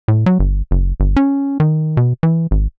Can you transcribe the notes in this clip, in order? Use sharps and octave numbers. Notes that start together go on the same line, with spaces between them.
A2
F#3
G1
F#1
G1
C#4
D#3
B2
E3
G#1